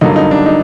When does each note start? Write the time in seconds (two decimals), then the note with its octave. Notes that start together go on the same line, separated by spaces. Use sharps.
0.01 G2 D3 F#3 A#3 D#4
0.16 D#4
0.31 D4
0.46 D#4